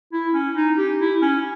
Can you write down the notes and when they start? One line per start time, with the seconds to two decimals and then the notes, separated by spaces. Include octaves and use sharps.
0.13 E4
0.34 C#4
0.56 D#4
0.78 G4
1.01 E4
1.22 C#4